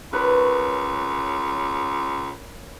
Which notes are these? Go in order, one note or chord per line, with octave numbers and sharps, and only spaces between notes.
C#2 A#4 B4 C#5